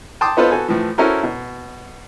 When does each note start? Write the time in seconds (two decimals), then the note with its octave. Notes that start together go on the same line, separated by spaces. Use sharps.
0.21 G5 A5 C6 D6 D#6
0.37 B3 D#4 F4 A4 B4 C5
0.52 B3 F#4 A4 G#5
0.68 A2 E3 F3
0.98 C#4 E4 F#4 A4 A#4 C5
1.23 B2